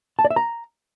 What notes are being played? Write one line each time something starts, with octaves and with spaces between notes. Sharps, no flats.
A5
D5
E5
A#5